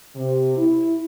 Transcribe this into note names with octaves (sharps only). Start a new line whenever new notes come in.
C3
E4